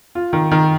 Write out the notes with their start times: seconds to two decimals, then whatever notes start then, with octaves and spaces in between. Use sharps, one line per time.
0.15 F4
0.33 D#3
0.51 D#3